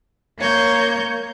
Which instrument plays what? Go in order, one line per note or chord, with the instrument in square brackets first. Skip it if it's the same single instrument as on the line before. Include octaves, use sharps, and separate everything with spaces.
[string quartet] A#3 C#5 G6